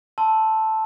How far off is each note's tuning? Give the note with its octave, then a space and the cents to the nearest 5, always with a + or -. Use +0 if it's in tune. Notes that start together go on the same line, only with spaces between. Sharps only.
A5 +0 C6 +0 E6 -5